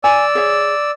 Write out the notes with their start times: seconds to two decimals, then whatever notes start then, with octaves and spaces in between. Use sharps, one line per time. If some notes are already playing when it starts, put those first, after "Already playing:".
0.04 D5 G#5 E6
0.35 G#4 C#5 E5